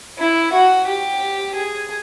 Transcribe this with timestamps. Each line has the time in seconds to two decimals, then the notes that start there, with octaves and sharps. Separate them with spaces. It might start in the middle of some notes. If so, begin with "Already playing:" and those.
0.18 E4
0.52 F#4
0.87 G4
1.55 G#4